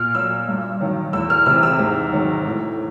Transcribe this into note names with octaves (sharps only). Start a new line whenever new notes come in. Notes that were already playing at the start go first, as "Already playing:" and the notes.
Already playing: A#2 F6
F#3 E6
G2
D#3 F#3
E2 E6
F6
C3 E3 E6
E6
G#2
D#3 F#3
A2